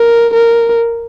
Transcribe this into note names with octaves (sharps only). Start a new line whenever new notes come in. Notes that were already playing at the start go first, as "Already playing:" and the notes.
Already playing: A#4
A#4